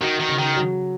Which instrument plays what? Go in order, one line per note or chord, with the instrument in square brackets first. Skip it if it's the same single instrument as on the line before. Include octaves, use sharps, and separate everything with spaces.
[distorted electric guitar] D#3 [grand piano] F#4
[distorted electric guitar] D#3
[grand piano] C#3
[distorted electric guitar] D#3
[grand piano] F#3